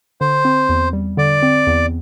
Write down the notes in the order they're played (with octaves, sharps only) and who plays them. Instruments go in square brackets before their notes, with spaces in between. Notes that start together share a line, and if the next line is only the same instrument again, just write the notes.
[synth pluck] D3 [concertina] C5
[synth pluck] C4
E2
G3
[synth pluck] D3 [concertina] D5
[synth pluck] C4
E2